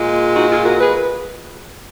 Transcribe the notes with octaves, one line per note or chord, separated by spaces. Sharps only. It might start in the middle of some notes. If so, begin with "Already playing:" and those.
Already playing: A#2 G#3
D#4 F#4
F4 G#4
F#4 A#4
G#4 B4